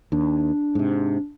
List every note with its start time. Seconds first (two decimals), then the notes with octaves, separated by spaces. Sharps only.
0.12 D#2 D4
0.75 G#2 C3